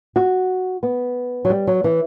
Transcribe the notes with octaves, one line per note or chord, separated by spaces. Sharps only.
F#4
B3
F#3
G3
F#3
E3